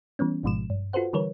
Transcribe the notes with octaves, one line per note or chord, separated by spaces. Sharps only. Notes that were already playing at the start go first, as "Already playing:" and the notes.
E3 G3 B3 C#4
G#1 G#2 B2 F3 G#3 E7
G2
F4 F#4 A4 B4 C5 F#5
D3 E3 G3 A#4 B4 C#5